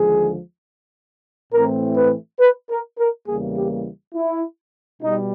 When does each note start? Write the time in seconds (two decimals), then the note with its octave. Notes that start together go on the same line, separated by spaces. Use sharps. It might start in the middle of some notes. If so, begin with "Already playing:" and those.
Already playing: D#2 D3 F3 G#3 G#4
1.53 A2 E3 A3 C4 A#4
1.96 B4
2.41 B4
2.70 A#4
2.99 A#4
3.28 E2 C#3 E3 G3 A#3 G#4
3.57 G4
4.15 E4
5.02 B2 G3 D#4